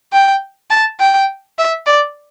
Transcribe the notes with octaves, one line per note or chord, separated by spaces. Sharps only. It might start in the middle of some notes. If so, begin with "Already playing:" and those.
G5
A5
G5
E5
D5